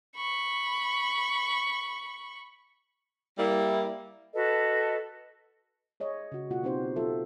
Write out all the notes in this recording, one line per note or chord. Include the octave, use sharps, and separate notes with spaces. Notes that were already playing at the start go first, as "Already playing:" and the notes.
B5 C#6
G3 A#3 E4
F#4 A4 B4 D#5
G#4 C#5 D#5
C#3 F#4
B2 A#3 F4 F#4 F#5
B3 C4 D#4 G4 C5
F#3 F4 A4 E5